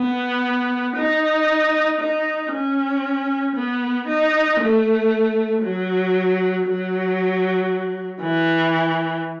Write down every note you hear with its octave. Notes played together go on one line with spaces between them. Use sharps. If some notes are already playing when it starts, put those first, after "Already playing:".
Already playing: B3
D#4
D#4
C#4
B3
D#4
A3
F#3
F#3
E3